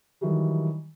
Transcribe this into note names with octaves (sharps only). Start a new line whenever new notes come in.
D#3 E3 F#3 G3